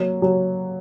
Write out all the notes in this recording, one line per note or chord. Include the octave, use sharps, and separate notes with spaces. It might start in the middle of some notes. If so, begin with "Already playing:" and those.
Already playing: F#3 A#3
F#3